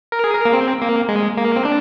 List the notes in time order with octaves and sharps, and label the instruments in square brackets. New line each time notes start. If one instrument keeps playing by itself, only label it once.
[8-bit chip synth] A#4
G#4
A#4
A#3
C4
A#3
G#3
A#3
C4
D4